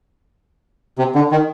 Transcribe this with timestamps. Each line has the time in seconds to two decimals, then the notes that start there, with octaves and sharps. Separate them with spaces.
0.98 C3
1.15 D3
1.32 D#3